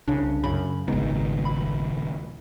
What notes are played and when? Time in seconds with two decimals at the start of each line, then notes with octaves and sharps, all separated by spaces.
0.08 C2 C#3 D4
0.44 F#2 C#3 B5
0.88 D#1 G#1 C#3 G#3 B3 D#4
1.45 B5